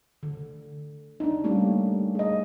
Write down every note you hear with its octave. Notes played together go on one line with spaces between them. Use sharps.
D3
D4 D#4
G3 A3 A#3 C#4 G4
G#4 D#5